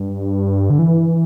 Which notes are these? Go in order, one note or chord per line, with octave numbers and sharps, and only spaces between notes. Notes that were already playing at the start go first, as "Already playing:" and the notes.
Already playing: G2
D3
E3